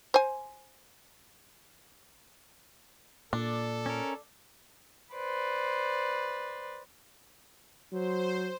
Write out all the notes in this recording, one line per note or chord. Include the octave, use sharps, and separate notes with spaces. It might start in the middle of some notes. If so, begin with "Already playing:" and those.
C5 G#5
A#2 D4 A4
C#4 A#4
B4 C5 D5
F#3 C5